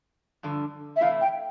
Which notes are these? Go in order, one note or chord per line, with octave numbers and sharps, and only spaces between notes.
G2 D3 F3
E5
C3 E3 A3 E4 F5
G5